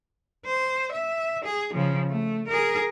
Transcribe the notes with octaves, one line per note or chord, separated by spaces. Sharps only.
C5
E5
G#4
C#3 F3
A3
G#4 A#4